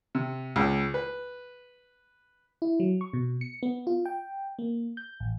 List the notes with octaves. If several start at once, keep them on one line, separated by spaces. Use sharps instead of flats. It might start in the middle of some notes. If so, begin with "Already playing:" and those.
C3
C#2
B4
E4
F#3
C#6
B2
C#7
B3
F4
G5
A#3
G6
A1